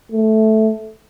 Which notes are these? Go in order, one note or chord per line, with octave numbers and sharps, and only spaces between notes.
A3